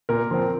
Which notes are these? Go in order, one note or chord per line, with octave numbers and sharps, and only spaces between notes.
A#2 A#4
F3 C4